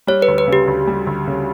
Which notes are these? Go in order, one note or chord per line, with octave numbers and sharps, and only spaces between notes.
G3 C#5
B4
D2
B4
C#3 G4
D2
G3
D2
C#3